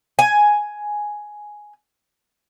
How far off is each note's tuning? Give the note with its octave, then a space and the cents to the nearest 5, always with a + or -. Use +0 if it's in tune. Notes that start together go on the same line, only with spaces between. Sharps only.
G#5 +5